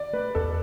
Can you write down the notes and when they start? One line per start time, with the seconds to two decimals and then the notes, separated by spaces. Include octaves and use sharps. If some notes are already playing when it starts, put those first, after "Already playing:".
Already playing: D5
0.13 A3 B4
0.35 E2 A4